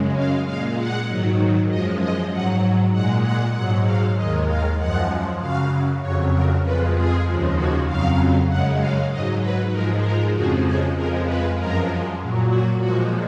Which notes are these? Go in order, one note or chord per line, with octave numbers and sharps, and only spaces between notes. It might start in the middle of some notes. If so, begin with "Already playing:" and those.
Already playing: F#2 C#3 G#3
F5
A#2 G#3 F5
F#5
G#2 D#3 F#3
F#2 F3 G#3 D#5
D#5
G#2 F#3 F#5
A#2 G#3 F#5
F#5
G#2 F#3 F#5
F5
D#2 D#3 G#3 D#5
F5
F#2 F3 G#3 F#5
F#2 C#3 F#3 F5
F2 C#3 F#3 C#5
A#4
F2 F3 G#3 B4
G#4
D#2 C#3 F3 G#3
F#4
F2 C#3 F#3 F5
F#2 C#3 G#3 F#5
F5
G#2 F#3 D#5
B4
G#2 F3 G#3 A#4
A#4
F2 C#3 F3 G#3 F#4
G#4
F2 F3 G#3 A#4
B4
F#2 F3 G#3 A#4
A#2 F#3
F#4
A#2 F3 G#3 F#4